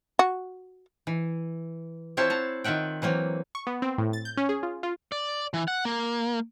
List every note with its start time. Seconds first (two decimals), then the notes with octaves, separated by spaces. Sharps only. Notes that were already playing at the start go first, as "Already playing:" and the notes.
0.19 F#4
1.07 E3
2.17 C4 E4 F4 C5 C#5 A5
2.30 F#5 A5 A#5
2.64 D#3 F4 E5 F#5 G5
3.02 E3 F#3 A#3 C4
3.55 C#6
3.67 B3
3.82 C4
3.98 A2
4.13 A6
4.25 G6
4.37 C#4
4.49 G#4
4.63 F4
4.83 F4
5.12 D5
5.54 E3
5.68 F#5
5.85 A#3